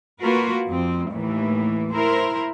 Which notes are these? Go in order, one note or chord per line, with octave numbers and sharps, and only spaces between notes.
A#3 F4 F#4 A#4 B4
F2 C4
D#2 A2 E3
E4 A#4 C5